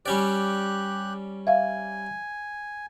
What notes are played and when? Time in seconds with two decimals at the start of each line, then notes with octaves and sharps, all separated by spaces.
0.06 G3 C#4 G4 D5 F#6
1.47 E5 F5 G#5